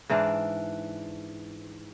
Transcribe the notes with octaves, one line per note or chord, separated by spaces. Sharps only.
G#2 E3 D4 F5